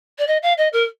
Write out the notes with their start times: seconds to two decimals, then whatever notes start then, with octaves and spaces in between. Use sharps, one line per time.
0.19 D5
0.27 D#5
0.43 F5
0.58 D#5
0.73 A#4